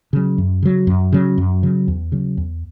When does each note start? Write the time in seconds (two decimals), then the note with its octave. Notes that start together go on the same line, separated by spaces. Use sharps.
0.13 C#3 F#3
0.38 F#2
0.63 C#3 F#3
0.87 F#2
1.12 C#3 F#3
1.38 F#2
1.63 C#3 F#3
1.88 E2
2.12 C#3 F#3
2.37 E2